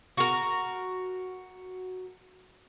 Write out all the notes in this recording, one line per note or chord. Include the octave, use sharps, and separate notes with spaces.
F#4 A#4